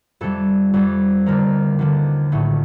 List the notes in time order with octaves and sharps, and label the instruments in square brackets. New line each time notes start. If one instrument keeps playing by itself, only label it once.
[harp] F2 C3 G3 A4
F2 C3 G3
D#2 D3 F3 A#4
D#2 D3 F3
A#1 A2 A3